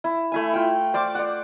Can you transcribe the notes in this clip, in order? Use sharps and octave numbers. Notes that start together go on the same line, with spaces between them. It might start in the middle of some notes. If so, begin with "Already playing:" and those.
E4
A3 E4 G#5
F4 G5
C5 D5 F5 D6
D5 F#5